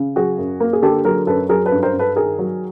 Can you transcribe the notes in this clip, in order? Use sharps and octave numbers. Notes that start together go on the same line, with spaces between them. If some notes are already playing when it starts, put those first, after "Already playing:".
Already playing: C#3
F#3 F#4 G#4
F#2
A#3
G#4
D3 G4 A4
F#3 G#4 A#4
F#2 A4 B4
F#3 G#4 A#4
A4 B4
G2
A#4 C5
G2
A4 B4
D#3 G#4 A#4
F#3